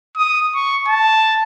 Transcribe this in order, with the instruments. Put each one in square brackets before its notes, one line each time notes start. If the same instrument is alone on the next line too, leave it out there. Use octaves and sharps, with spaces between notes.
[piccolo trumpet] D#6
C#6
A5